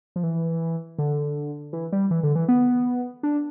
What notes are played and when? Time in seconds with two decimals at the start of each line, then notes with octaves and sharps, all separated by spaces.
0.16 F3
0.23 E3
0.99 D3
1.73 E3
1.92 G3
2.11 E3
2.23 D3
2.35 E3
2.49 B3
3.23 D4